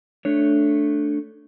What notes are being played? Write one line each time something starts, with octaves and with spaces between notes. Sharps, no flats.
A3 D4 C#5